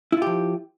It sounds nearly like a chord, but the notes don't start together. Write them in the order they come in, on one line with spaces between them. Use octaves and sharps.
E4 F4 G4 F3